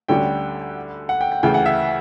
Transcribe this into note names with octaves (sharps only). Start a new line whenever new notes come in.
D2 D3 G3 C#4 F#4 G5
F#5
G5
G5
D2 C#3 E3 G5
F#5
E5